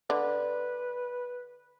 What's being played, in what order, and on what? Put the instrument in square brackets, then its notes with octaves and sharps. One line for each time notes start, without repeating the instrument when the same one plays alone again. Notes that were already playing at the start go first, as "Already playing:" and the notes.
[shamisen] D3 [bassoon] B4 [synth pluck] D5